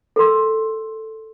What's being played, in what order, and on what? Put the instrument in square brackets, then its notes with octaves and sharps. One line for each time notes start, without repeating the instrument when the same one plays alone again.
[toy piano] A4 A#4 C6 E6